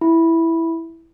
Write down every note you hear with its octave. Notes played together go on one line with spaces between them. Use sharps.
E4